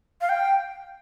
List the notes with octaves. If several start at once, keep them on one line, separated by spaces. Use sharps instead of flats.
F5
G5